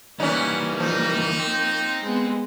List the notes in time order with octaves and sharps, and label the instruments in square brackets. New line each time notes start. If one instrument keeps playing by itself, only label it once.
[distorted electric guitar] E3 G3 [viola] A#3 [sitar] C#4 D#4 [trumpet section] E4 F#5
[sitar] F3 [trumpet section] D#4
[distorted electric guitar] C5 G5
[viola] G#3 B3